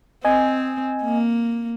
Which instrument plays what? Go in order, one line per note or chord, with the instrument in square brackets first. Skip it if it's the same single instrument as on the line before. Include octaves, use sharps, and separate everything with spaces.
[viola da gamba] C4 [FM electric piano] D#5 G#5
[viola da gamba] A#3